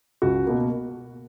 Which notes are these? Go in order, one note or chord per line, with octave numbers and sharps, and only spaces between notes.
C#2 F#4
B2 A#3